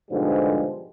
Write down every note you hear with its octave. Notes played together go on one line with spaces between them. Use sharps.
G#2 B2 D3 F3 G3 G#3